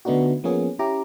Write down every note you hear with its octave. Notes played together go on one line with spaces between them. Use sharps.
D3 A3 B3 D4 D#4 F#4
F3 A#3 B3 C#4 G#4
C#4 E4 G4 A#5 D6